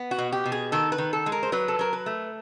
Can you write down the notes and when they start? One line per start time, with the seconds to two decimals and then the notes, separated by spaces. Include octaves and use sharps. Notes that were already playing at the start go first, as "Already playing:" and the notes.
Already playing: B3
0.11 F#4
0.18 B2
0.32 G4
0.46 B2
0.52 G#4
0.72 D#3 A4
0.92 B4
0.98 D#3
1.13 A4
1.26 G#3
1.32 A#4
1.43 C5
1.52 F#3 B4
1.68 A4
1.79 F#3 A#4
1.93 B4
2.06 A3